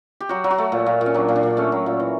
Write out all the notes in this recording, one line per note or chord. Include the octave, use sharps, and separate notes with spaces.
G4
F#3 F#4
F#3
F#4
A3
A#2
A#2
A#2
C#4
F#3 D4
A#2
D4
A#2
A3 C#4
F#3
A#2
E3